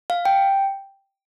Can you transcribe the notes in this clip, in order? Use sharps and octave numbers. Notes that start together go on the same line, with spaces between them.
F5
G5